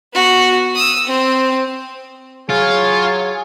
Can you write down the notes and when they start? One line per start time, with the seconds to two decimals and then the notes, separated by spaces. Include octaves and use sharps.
0.13 B3 F#4
0.75 D#6 E6
1.07 C4
2.50 F#3 F4 G#4 C#5